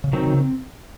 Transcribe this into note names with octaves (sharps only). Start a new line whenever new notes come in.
C#3
C3 D#3 F#3 C4
C#3
C4